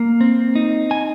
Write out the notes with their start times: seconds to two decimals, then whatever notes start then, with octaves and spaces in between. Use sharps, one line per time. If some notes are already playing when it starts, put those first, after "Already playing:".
Already playing: A#3
0.21 C4
0.55 D#4
0.91 G#5